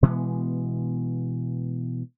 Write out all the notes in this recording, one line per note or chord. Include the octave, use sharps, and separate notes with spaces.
B2 E3 G#3 B3